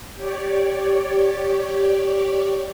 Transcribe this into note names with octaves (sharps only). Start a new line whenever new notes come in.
G4 C#5 D5